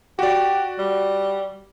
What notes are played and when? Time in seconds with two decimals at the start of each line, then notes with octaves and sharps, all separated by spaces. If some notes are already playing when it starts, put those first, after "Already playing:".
0.19 F#4 G4 D5
0.79 G3